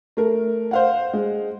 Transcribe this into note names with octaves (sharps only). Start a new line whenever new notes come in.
A3 A#4
C5 F5 F#5
G#3